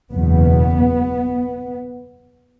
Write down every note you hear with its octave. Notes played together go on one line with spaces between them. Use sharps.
F#1 E2 B2 B3